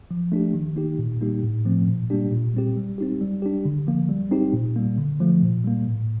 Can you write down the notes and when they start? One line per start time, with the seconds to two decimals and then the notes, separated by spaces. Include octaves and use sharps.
0.11 F3
0.32 A3 D4 G4
0.54 D#3
0.76 A#3 D#4 G4
0.99 A#2
1.21 G3 A#3 D#4 G4
1.43 A2
1.66 F3 A3 C4
1.88 A#2
2.10 G3 A#3 D4 G4
2.31 A#2
2.54 G3 C4 G4
2.77 G3
2.98 C4 D#4 G4
3.21 G3
3.42 D4 G4
3.65 D3
3.87 F3 A#3
4.09 G3
4.31 C4 D#4 G4
4.54 A#2
4.76 G3 A#3
4.98 D3
5.21 F3 A3
5.42 A#2
5.64 G3 A#3
5.87 A2